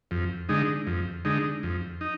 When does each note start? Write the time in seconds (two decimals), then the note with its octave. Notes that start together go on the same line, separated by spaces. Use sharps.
0.11 F2
0.49 D3 G#3 D#4
0.87 F2
1.25 D3 G#3 D#4
1.63 F2
2.01 D#4